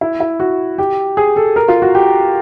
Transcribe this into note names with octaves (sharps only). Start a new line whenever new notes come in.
E4
E4
F#4
G4
G#4
A4
A#4
F4
F#4
G4